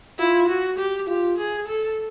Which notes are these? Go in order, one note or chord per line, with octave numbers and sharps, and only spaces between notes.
E4 F4
F#4
G4
F4 G4
G#4
A4